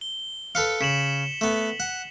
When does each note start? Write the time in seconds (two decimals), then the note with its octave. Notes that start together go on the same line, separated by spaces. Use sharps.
0.01 G7
0.55 A4 B4 F5 C#7
0.81 C#3 B6 E7 F#7
1.41 A3 B3
1.80 F#5